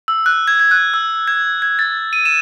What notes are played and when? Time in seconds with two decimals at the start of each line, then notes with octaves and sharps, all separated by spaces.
0.08 E6
0.26 F#6
0.48 G#6
0.60 G#6
0.71 F#6
0.94 E6
1.28 G#6
1.62 G#6
1.79 A6
2.13 D#7
2.26 E7